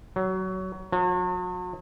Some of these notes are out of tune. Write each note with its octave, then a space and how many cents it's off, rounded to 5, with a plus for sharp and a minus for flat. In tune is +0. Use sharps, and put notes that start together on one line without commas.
F#3 +20
F#3 -45